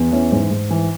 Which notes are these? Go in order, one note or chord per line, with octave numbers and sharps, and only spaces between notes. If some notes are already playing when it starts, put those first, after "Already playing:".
Already playing: E2
E3 C#4
G#2
G#2
E3